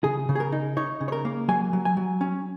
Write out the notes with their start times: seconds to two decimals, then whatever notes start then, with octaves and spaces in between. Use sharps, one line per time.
0.04 C#3 G#4
0.29 C#3
0.35 G#4
0.40 A#4
0.52 D#4
0.77 D#4 C#5
1.01 C#3
1.08 C#5
1.12 A#4
1.25 A#3
1.48 F#3 G#5
1.73 F#3
1.85 G#5
1.97 F#3
2.21 C#4